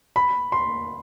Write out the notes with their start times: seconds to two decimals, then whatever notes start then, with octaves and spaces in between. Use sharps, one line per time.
0.16 B5
0.52 C6